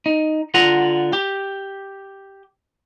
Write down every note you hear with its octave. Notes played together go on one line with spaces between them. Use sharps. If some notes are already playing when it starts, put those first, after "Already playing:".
D#4
D3 F4 F#5 A#5
G4